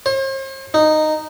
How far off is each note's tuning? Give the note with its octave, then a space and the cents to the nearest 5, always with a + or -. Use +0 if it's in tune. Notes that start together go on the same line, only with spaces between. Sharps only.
C5 +45
D#4 -10